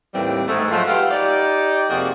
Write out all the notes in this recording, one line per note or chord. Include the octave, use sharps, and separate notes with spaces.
D#2 A2 E3 G3 C4
G#2 A3
F3 F#3 G#3 A3
F4 G4 B4 F5 F#5
D#4 G4 D5
F2 C3 A#3 F#4 G#4